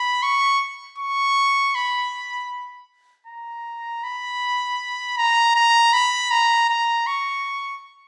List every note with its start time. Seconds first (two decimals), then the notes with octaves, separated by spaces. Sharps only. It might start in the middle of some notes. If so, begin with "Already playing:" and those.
Already playing: B5
0.23 C#6
0.98 C#6
1.75 B5
3.26 A#5
4.04 B5
5.17 A#5
5.55 A#5
5.93 B5
6.31 A#5
6.70 A#5
7.07 C#6